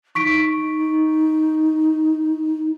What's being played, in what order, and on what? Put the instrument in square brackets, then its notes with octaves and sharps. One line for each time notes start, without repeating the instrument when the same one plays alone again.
[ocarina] D#4 [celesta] C#6 B6 D7